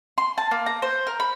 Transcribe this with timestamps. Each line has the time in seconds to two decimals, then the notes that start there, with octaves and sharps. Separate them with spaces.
0.18 C6
0.38 A5
0.51 A#3
0.66 A#5
0.82 C5
1.07 A#4
1.20 B5